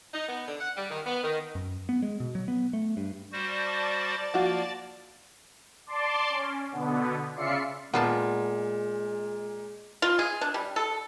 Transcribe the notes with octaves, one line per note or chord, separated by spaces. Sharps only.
D#4
B3
D3
F#5
G3
D#3
B3
D#3
F#2
B3
G#3
B2
F#3
B3
A3
G2
G3 F#4 C5 D5 A5 A6
F3 A#3 F#4
D5 A5 C6 D6
C#4
B2 D3 B3
C#3 F4 D5 E5 C7 C#7
A#2 G#3 B3 F4 F#5 A5
F4
G#4
D4
G3
A4